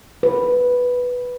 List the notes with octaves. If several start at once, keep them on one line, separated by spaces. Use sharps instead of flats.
B4